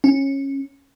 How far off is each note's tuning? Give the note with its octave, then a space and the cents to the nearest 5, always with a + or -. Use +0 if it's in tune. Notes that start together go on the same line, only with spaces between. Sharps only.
C#4 -20